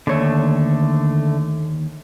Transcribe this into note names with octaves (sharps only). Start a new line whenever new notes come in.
D#2 D3 A3 C#5